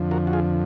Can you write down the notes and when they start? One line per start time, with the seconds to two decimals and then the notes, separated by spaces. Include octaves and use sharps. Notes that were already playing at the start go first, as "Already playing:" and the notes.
Already playing: F2 D3 F3
0.11 F#4 A#4
0.27 F#4
0.33 F4 G#4